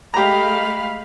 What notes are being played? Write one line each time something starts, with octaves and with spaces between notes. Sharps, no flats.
G#3 A3 G4 F5 A#5 B5